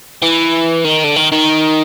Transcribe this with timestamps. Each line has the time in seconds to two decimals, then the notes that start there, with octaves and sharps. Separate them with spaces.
0.22 E3
0.85 D#3
1.04 D3
1.16 D#3
1.32 D#3